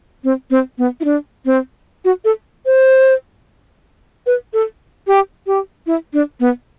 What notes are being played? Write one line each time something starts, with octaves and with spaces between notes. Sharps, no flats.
C4
C4
B3
E4
D4
C4
F#4
A4
C5
B4
A4
G4
G4
E4
D4
B3